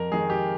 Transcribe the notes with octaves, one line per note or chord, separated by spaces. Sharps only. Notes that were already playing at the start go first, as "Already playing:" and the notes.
Already playing: F2 A#4
D#3 G#3 G#4
G4